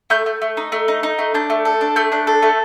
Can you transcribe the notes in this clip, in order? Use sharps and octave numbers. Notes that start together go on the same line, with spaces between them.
A3 G6
A3
A3
D#4
A3
D#4
D#4
A3
D4 G6
A3
A4
D4
A3 G6
D4 F#6
A4
A3